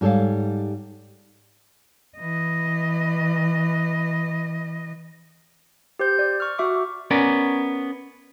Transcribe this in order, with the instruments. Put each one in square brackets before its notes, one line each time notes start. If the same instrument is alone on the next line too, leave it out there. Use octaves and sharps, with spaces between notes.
[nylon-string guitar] G#2 G3 A4 C#5 F5
[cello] E3 D#5
[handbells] G4 C5 G6
D5
C#6 F6
F#4 E5 C#6 D6
[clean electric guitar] B3 C#4 A#4 D5